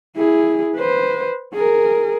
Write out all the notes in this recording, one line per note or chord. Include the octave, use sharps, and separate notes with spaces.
E4 G#4
B4 C5
G#4 A#4